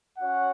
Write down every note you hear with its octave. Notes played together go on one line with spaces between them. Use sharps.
C#4 F#4 C#5 F#5